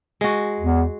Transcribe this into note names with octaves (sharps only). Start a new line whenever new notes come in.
G#3 F#4
E2